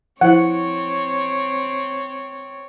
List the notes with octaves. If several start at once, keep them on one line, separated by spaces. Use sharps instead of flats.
F3 C4 E4 C5 C#5 F#5